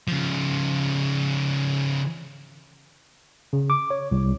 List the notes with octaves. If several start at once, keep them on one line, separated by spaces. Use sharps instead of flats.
C#3 F3
C#3
D6
C#5
C2